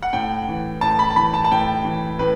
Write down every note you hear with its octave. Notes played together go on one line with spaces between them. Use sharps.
F#5
A2 G5
E3
A2 A5
B5
A5
E3 B5
A5
A5
A2 G5
E3
A2 B4